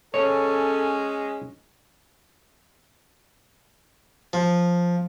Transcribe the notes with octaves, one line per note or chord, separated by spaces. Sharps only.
G#3 C#4 A4 C#5
F3